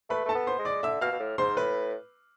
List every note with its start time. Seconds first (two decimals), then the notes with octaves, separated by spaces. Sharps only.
0.10 A3 B4 B5
0.26 A3 A4 A5
0.35 B3
0.47 C5 C6
0.59 G#3
0.65 D5 D6
0.83 D3 E5 E6
1.01 B2 F5 F6
1.12 B2
1.20 A2
1.38 G#2 C5 C6
1.57 A2 B4 B5